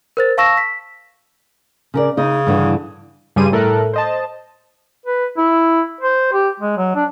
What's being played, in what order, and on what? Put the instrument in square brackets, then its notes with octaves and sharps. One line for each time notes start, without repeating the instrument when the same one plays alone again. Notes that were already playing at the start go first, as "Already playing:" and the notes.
[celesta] A#4 C5 A6
F5 A5 C#6 E6 A#6 E7
B6
[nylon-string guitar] C#3 A#4 D5
[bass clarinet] C#3 [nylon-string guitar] D#4 D#5
[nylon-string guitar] G2 D3 E3
[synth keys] G2 C#3 G3 G#4 C6 D#7
A2 A4 A#4 E5 F#6
C5 D#5 A5
[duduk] B4
E4
C5
G4
G#3
F#3
D4